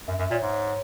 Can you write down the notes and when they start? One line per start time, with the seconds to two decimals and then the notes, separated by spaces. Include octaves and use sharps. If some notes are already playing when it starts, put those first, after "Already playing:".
0.08 F#2 E5
0.19 F#2
0.31 A#2 C#5
0.42 G#2
0.53 C#5